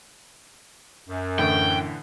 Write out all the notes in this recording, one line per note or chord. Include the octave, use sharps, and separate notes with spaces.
F#2
A2 D3 E3 G5